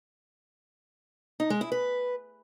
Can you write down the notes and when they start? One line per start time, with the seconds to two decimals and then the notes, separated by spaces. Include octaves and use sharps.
1.40 D#4
1.50 G#3
1.61 E4
1.72 B4